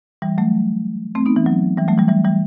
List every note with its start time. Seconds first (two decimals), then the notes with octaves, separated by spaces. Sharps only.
0.22 E3 G3
0.38 F#3 A3
1.15 A3 C4
1.26 B3 D#4
1.36 E3
1.46 F#3
1.77 E3 G3
1.88 F#3 A3
1.98 E3 G3
2.08 E3 G3
2.25 E3 G3